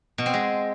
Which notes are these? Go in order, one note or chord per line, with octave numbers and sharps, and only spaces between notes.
B2
C4
G#3